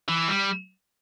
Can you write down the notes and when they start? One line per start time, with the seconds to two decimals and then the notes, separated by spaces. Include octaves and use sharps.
0.09 E3
0.28 G3